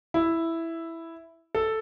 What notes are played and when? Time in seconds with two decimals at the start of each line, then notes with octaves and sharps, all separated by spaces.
0.14 E4
1.55 A4